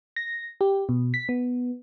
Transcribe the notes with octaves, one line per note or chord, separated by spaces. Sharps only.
A#6
G4
B2
B6
B3